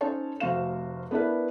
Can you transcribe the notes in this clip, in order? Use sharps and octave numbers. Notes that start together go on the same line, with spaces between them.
C#4 D#4 A4 C5 C#5 A5
F1 A3 F#4 C5 F5 E7
B3 D4 E4 A#4 B4